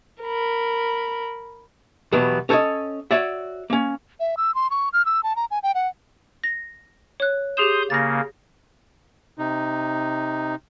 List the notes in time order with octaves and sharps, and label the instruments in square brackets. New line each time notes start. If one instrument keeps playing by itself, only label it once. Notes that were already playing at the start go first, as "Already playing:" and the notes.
[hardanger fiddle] A#4 B5
[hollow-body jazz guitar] E2 B2 F#3 G3 B3
C#4 A4 B4 C#5 D#5
F#4 C#5 D5 E5
A#3 C#4
[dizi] E5
E6
C6
C#6
F6
E6
A5
A#5
G#5
G5
F#5
[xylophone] A#6
C#5 F#6
[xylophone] G4 G#4 E7 [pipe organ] C6 D#6 G6
[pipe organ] C#3 A#3 [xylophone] A6 A#6
[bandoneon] C3 D#4